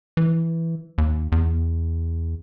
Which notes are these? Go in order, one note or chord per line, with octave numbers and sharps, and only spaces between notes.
E3
D#2
E2